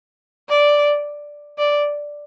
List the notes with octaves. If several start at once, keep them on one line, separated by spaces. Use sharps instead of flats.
D5
D5